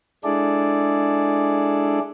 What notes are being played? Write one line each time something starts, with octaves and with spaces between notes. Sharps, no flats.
G#3 D4 E4 G#4 A4 D5